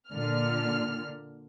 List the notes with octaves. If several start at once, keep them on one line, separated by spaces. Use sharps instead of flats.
A#2 D3 F6